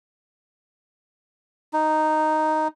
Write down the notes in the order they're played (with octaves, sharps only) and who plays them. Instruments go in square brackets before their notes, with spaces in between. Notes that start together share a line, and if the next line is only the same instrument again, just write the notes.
[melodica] D#4